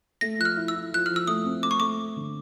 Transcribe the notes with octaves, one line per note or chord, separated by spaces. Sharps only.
A3 A#6
F3 F#6
F6
E4
E6
E4
F3 F#6
F3 F6
E6
A3 D#6
C4
A3 D6
C#6
A3 D6
A3
D3